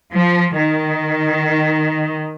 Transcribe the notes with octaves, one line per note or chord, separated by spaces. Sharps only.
F3
D#3